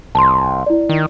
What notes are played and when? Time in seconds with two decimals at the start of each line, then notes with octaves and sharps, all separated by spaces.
0.15 C2 A5 C6
0.66 E4 D5
0.89 D#3